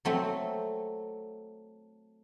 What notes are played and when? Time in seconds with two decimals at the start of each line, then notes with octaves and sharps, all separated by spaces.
0.05 F#3 A3 C4